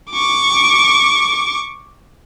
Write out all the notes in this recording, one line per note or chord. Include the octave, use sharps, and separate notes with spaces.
C#6 D6